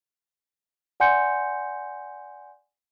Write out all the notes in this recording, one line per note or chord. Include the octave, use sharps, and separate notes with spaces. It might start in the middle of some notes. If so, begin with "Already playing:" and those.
D5 F#5 G#5 C6 G6 C#7